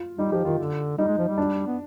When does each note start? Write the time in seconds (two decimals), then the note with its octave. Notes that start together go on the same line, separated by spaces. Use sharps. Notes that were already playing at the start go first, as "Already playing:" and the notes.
Already playing: F4
0.18 G3 D#4
0.32 F3 G4
0.45 D#3 F4
0.59 D3
0.98 G3 D#4
1.07 G#3
1.18 F3
1.28 G3
1.38 D4
1.66 B3